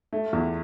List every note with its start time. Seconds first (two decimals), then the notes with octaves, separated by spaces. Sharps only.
0.13 A3
0.33 E2